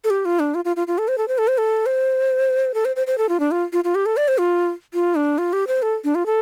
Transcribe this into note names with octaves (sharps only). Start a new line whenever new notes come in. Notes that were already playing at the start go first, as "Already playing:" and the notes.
A4
G4
F4
D4
F4
F4
F4
F4
A4
C5
A4
C5
A4
C5
A4
C5
A4
C5
C5
C5
A4
F4
D4
F4
F4
F4
G4
A4
D5
C5
F4
F4
D4
F4
G4
C5
A4
D4
F4
A4